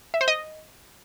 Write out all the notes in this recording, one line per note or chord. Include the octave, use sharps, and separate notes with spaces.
E5
C5
D#5